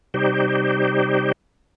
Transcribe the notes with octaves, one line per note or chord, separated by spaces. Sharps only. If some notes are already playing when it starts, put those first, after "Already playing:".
C3 G3 D#4 G4 C5